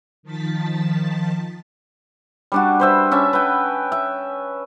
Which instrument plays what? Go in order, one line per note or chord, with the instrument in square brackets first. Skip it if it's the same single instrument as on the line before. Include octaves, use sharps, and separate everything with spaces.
[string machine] D#3 F3 A5 A6 B6
[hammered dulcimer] G3 D4 F#4
B4 C5 E5
C#4 E5 A5
B4 G5
E5